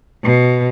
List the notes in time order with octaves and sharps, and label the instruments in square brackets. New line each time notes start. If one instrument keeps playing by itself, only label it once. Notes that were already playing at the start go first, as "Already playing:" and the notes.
[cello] B2